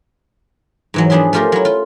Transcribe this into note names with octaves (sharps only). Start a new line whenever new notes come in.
G#2 E3 F#3
F3 B3 D4 G#4 E5 C6
A3 C#4 F4 G4 A#4
F#3 E4
F4